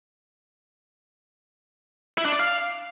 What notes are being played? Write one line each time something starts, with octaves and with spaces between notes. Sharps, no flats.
E4
D4
D5
F5